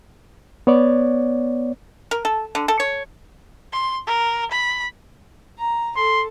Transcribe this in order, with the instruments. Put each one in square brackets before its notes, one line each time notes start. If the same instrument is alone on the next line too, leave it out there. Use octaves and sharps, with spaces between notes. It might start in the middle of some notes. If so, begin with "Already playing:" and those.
[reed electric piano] B3 C#5 D5
[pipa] A#4
A4
D3
A4
C#5
[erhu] C6
A#4
B5
[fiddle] A#5
[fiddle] A4 [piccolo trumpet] C6